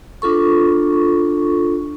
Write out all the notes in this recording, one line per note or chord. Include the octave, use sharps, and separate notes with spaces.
D4 F4 A4 C#6